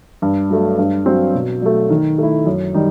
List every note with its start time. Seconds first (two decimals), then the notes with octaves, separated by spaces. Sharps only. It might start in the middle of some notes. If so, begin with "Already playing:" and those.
0.22 G2
0.50 F#3 A3
0.78 G2
1.06 F#3 C4
1.35 B2
1.62 F#3 A3
1.90 D#3
2.18 A3 E4
2.46 F#2
2.75 D#3 G3 D#4